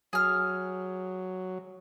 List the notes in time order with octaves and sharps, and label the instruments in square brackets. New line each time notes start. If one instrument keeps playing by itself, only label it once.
[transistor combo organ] F#3 [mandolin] G#4 F6